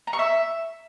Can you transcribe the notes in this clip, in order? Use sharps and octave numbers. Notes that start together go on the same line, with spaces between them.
A#5
C#6
E5